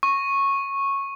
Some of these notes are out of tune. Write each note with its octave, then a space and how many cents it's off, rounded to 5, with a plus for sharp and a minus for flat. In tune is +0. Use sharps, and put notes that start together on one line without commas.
C#6 -10